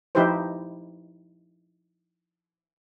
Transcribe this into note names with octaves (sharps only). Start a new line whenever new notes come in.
F3 D#4 E4 G4 B4 C5